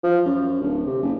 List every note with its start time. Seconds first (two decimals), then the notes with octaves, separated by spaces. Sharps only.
0.04 F3
0.26 F#2
0.62 D1
0.86 C3
1.02 F#1